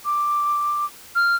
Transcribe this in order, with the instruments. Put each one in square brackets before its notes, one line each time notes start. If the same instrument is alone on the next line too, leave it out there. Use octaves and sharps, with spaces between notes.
[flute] D6
[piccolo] F6